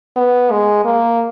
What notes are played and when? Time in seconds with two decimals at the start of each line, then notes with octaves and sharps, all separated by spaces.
0.16 B3
0.51 G#3
0.84 A#3